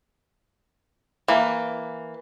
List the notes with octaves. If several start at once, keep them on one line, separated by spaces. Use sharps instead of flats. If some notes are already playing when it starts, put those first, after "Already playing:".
E3 A#3